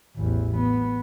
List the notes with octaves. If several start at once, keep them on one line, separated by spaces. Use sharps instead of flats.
A1 E2
B3